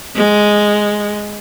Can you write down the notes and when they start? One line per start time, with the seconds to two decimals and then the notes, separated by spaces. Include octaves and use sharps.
0.16 G#3